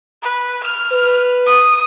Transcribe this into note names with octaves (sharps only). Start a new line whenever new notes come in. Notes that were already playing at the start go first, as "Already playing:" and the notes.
B4
F6
B4
D#6